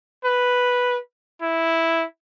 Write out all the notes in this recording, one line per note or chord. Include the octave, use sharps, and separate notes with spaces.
B4
E4